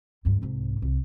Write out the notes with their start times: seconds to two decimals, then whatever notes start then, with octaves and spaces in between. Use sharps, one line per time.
0.25 D2 G2
0.42 C2 G#2
0.82 C2